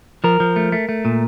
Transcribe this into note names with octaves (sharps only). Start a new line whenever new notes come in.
F3 A#4
F3
A3
A3
A3
A#2